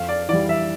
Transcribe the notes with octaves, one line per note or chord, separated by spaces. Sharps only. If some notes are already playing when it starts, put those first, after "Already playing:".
Already playing: F2 F5
D5
E3 G3 D5
E5